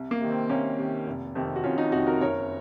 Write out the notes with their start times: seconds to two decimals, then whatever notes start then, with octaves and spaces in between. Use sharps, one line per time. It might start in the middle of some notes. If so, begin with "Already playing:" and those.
Already playing: C2
0.11 A#3
0.21 C3 D#3
0.30 C4
0.49 C2 A#3 C#4
0.78 C3 D#3
1.07 F1
1.35 F2 C3 D#3
1.56 F#4
1.64 F1 C#4 F4
1.78 D#4 F#4
1.92 F2 C3 D#3 D#4 F#4
2.07 F#4 A#4
2.21 F#1 A#4 C#5